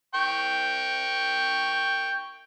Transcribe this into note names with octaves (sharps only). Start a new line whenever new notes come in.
G5 C#6